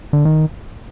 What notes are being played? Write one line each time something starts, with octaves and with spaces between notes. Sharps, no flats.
D3
D#3